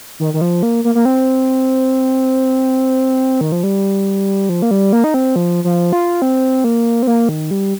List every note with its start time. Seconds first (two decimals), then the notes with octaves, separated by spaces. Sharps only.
0.20 D#3
0.34 D#3
0.41 F3
0.63 A#3
0.84 A#3
0.95 A#3
1.05 C4
3.41 D#3
3.52 F3
3.63 G3
4.49 F3
4.62 A#3
4.71 G3
4.93 A#3
5.04 D#4
5.14 C4
5.36 F3
5.64 F3
5.93 F4
6.22 C4
6.64 A#3
7.03 C4
7.07 A#3
7.29 D#3
7.51 G3